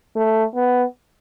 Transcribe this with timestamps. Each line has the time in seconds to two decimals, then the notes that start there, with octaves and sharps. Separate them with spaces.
0.16 A3
0.55 B3